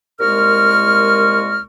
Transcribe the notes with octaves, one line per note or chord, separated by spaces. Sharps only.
C2 A#2 G#3 A#4 C#6 F6